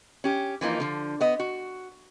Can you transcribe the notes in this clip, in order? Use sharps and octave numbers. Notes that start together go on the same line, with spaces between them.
C#4 G4
E3 F3 A#3 D#4
D3 F3
B3 D#5
F#4